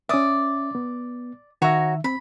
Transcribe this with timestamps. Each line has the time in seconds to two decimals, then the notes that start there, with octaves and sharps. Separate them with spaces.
0.09 C#4 D5 E5 D#6
0.75 B3
1.62 D#3 F#4 C#5 E5 A#5
2.04 C4 B5